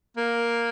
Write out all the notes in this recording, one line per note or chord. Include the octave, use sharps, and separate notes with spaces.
A#3